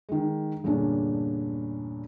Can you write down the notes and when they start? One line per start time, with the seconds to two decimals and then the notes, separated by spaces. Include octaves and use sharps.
0.09 D#3 G#3
0.64 E2 G2 A#2 D3 C#4 D4